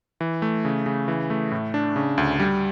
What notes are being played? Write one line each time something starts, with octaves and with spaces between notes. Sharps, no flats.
E3
A3
C#3
C#3
E3
A3
A2
D4
C#3
D2
G3